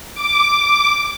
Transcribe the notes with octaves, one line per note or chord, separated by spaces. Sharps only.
D6